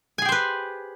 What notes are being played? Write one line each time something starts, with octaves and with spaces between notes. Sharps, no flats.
G4 G#4 B4 C5 G#5